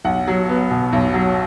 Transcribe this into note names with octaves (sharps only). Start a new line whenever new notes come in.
B1 F#5
F#3
B3
B2
B1
F#3